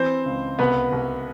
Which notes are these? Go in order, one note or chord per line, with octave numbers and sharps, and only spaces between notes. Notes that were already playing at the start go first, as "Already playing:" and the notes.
Already playing: E3 C4 C5
C#2
C2 B3 B4
C2